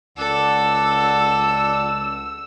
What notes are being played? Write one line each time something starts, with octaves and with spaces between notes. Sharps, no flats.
C#2 A4 D5 F#5 E6